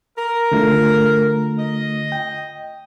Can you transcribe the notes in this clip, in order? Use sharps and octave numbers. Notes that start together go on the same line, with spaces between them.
A#4
D3 A3 F4
D#5
G5